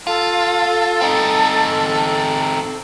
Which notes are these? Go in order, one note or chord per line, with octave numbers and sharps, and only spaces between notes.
F4 A4
C4 D#4